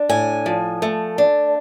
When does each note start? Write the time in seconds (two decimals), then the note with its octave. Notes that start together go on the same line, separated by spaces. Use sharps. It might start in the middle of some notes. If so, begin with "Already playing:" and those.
Already playing: D4
0.09 A2 G#5
0.46 F3
0.82 A3
1.18 D4